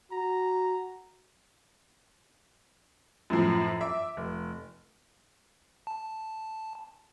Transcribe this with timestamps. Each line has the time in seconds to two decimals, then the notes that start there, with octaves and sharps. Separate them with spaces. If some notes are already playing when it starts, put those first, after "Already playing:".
0.12 F#4 A#5
3.30 F#2 A2 F3
3.81 E5 D6
4.17 F1
5.87 A5